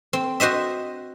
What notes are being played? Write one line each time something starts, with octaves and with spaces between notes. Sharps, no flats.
C4
F#4 C5 D#5 E5